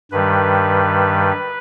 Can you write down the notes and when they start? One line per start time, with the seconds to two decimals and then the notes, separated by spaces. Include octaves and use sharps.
0.11 G2 D#3 G3 B4